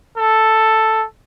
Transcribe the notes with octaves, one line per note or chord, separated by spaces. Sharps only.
A4